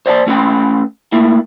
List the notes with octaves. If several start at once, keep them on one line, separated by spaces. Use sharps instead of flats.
C5 D5 F#5 A5
A3 C#4 B4 G5
A3 A#3 E4